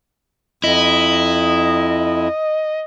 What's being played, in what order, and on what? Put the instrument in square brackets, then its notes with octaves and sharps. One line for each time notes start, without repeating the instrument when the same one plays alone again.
[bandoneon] F2 [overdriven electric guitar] E4 [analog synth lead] D#5